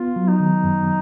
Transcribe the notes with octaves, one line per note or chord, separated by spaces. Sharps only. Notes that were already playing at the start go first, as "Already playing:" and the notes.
Already playing: B3 F4
F#3
D#4
D#3
F#2